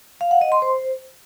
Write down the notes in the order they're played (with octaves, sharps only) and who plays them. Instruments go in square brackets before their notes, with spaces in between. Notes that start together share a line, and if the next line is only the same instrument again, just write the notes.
[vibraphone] F5
F#5
D#5
C6
C5